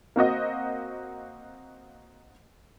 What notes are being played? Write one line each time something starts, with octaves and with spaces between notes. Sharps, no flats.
A#3 C4 F#4 D#5